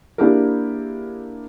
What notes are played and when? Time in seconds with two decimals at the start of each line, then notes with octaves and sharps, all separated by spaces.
0.18 A#3 D4 E4 G4 G#4 A#4